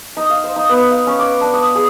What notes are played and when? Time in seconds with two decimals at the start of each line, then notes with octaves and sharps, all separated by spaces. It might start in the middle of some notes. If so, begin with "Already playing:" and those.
0.17 D#4
0.30 F5
0.44 C5
0.56 D#4
0.69 B3
0.91 F5
1.07 C#4
1.19 D6
1.41 D4
1.54 D#6
1.75 G#4